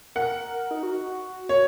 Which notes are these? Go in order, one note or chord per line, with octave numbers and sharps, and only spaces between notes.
A#4 F#5
D#4
F#4
C#5